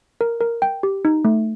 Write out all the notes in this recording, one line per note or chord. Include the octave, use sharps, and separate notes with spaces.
A#4
A#4
G5
G4
D#4
A3